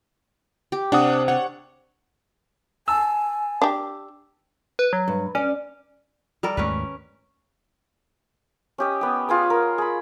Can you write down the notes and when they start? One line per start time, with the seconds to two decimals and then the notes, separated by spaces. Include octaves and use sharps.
0.72 G4
0.92 C3 D4 F#5 D#6
1.28 D4 C#5 F#5
2.88 G#5 A5 E6
3.62 D4 G4
4.79 B4
4.93 F#3
5.08 G2
5.35 C#4 D5
6.43 G3 A4 A#4
6.57 D#2 G#2 A3 C#4 A#4 B4
8.78 C#4 G4 D#5
9.01 B3 G4
9.29 F4 G#4 B4
9.50 A#4
9.78 G#4 B5